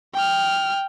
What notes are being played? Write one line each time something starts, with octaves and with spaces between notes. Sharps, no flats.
G5 F6